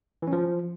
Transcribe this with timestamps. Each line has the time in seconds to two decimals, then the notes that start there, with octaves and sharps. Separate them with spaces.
0.22 E3
0.27 C#4
0.33 F3